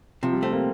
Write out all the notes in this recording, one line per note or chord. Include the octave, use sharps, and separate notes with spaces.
C3 F3
G3
A3 C4
A#3